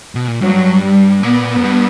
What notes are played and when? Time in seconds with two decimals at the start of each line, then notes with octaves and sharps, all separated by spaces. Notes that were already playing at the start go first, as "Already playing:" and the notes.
0.15 B2
0.28 A#2
0.41 G2 F#3
0.82 G3
1.23 A#2 B3
1.56 F#2
1.64 G2